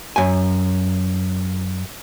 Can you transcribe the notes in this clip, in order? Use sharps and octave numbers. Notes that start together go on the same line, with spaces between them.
F#2 G#5